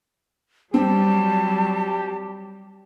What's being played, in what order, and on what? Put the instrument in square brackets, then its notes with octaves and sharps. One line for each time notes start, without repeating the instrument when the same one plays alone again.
[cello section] F#3 G3 [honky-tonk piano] C4 [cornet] G4 [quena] A5